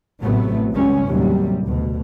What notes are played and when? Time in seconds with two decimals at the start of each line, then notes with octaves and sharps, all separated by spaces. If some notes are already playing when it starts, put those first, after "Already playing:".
0.22 A1 A2 C3 F#3 A3 B3
0.74 C#2 C#3 G3 C#4
1.06 D#2 A2 C3 F#3 G3
1.64 D2 B2